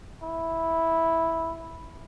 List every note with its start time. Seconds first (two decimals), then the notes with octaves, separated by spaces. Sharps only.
0.23 E4